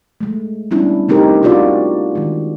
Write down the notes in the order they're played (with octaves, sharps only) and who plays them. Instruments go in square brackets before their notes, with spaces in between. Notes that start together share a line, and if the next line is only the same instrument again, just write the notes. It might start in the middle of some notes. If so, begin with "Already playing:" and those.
[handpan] G#3 A3
G3 B3 C#4 D4 E4
A3 C4 D#4 G4 A#4
D4 D#4 F4 F#4 D5
D#3 G#3